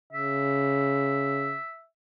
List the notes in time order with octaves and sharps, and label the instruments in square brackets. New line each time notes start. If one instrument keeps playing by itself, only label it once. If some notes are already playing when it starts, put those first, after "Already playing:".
[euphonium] C#3 [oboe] E5